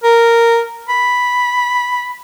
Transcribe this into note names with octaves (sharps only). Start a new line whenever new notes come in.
A#4
B5